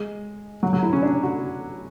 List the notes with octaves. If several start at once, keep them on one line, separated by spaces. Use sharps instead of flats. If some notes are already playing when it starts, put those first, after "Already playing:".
Already playing: G#3
F#3
F#3
E4
C#4
D4
F#4